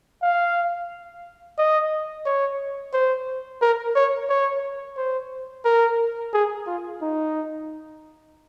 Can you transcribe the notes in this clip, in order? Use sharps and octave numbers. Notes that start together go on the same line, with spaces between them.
F5
D#5
C#5
C5
A#4
C#5
C#5
C5
A#4
G#4
F4
D#4